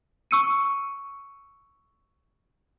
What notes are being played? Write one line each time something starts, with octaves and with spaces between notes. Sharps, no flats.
C#6 E6 C#7 D#7